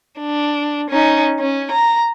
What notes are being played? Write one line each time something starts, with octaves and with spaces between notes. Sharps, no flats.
D4
C#4 D#4
C#4
A#5